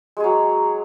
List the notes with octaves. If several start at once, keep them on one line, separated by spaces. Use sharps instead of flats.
F#3 G#3 G#4